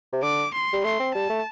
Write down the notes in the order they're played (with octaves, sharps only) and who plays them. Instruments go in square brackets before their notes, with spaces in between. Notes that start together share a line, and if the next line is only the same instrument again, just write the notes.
[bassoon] C3
[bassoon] D3 [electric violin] D6
[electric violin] C6
[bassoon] G3
[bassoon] A3 [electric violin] C6
[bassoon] C4
[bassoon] G3 [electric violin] A5
[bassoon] A3